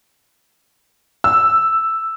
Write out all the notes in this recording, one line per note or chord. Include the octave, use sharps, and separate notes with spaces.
E6